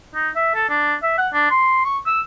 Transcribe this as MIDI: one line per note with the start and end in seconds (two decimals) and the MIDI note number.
0.15 0.29 63
0.36 0.52 76
0.55 0.66 69
0.69 0.94 62
1.03 1.14 76
1.18 1.28 78
1.33 1.47 62
1.50 1.84 84
1.85 1.98 85
2.06 2.21 88